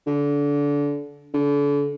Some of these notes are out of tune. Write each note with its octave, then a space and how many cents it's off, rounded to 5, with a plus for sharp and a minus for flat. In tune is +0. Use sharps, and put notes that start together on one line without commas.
D3 -25
D3 -35